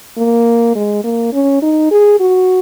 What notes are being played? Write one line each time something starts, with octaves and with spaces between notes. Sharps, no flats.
A#3
G#3
A#3
C#4
D#4
G#4
F#4